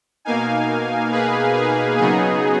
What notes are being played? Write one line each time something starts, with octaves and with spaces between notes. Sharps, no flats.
B2 A#3 D#4 F5 G#5
G#4 B4
G#4
C#3 F#3 B3 D#4 G#4